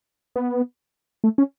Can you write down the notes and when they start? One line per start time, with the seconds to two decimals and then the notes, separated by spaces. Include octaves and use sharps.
0.36 B3
1.24 A3
1.38 C#4